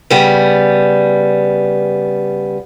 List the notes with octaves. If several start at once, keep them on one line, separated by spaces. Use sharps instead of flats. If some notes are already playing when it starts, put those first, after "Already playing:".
C#3 G3 B3